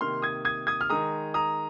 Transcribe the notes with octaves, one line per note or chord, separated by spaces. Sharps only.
C3 D#3 A#3 C6 F6
D#6 G#6
D#6 G#6
D#6 G#6
F6
D#3 G#3 A#5 D#6
A#5 D#6